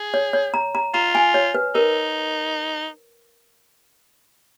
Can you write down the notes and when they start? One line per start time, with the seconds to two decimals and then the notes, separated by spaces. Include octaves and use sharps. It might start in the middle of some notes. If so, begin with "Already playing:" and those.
Already playing: G#4
0.14 C#5
0.33 C#5
0.54 A#5
0.75 A#5
0.94 F4 A#5
1.15 G#5
1.34 C#5
1.55 B4
1.75 D#4 A#4